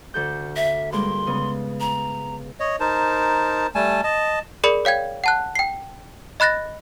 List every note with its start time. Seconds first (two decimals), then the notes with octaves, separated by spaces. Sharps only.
0.14 D2 A4 G6
0.56 E5
0.92 G2 G#3 A#3 C6
1.27 C#3 B3
1.80 A#5
2.60 C#5 D#5
2.80 D#4 A#4 C5 A5
3.75 G3 A3 G#5 A5
4.04 D#5 A5
4.64 G#4 A#4 D5 B5 C#7 F#7
4.85 C#5 F5 G5 G#6
5.24 F#5 A5 F#6
5.55 G5 C7
6.40 D#5 B5 F#6 A6 A#6